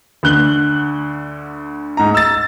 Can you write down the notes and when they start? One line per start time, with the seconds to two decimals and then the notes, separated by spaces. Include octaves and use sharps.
0.23 D2 D3 F#6 G7
1.97 G#2 A#5
2.15 E6 A6